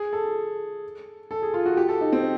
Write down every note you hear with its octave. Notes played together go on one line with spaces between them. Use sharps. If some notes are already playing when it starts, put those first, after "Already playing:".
Already playing: G#4
A4
A4
G#4
F4
F#4
G4
A4
D#4
C4